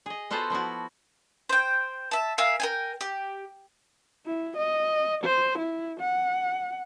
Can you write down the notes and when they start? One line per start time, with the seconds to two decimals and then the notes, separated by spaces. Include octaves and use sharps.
0.06 G#4 D#5
0.30 B3 F4 F#4 A4 C5
0.50 F3 B3 E4 F#4
1.49 C5 G5
2.11 E5 A5
2.38 A#4 E5 F5 G#5
2.60 A#4 G5 G#5
3.01 G4
4.26 E4
4.57 D#5
5.24 C5
5.58 E4
6.00 F#5